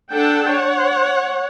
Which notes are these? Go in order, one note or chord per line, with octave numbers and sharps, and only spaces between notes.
D4 A4 F#5 G5 A5
C#5 F#5